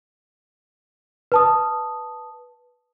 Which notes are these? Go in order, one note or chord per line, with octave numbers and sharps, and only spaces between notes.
B4 A5 D#6